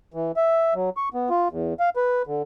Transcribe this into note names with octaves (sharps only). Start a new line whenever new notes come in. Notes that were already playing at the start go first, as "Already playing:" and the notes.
E3
E5
F#3
C#6
B3
F4
E2
F5
B4
D3